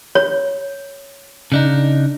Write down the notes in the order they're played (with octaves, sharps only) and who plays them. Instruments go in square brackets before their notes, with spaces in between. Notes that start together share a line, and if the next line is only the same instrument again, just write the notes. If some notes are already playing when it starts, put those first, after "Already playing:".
[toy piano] C#5
[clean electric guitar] C#3 D4 D#4